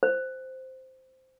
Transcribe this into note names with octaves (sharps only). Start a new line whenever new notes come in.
C5